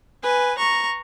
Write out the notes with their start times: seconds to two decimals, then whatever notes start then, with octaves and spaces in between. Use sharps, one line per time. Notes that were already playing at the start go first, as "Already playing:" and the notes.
0.23 B4 G#5
0.58 A#5 C#6